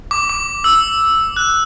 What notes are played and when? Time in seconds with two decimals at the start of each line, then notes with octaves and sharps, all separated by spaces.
0.11 D6
0.29 D6
0.64 E6
1.37 F#6